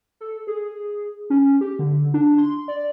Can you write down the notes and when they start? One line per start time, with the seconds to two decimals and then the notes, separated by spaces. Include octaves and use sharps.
0.21 A4
0.47 G#4
1.30 C#4
1.61 G4
1.79 D3
2.14 D4
2.38 C6
2.68 D5